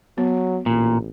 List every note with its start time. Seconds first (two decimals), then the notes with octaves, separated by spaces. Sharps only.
0.18 F#3 B3
0.66 A1 A#2